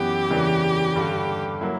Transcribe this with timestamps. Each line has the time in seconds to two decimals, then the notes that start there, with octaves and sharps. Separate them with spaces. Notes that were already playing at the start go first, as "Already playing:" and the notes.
Already playing: F#2 E3 B3 G4
0.30 E2 C#3 E3 A#3 D4
0.95 G2 D3 G3
1.61 F#3 A#3 E4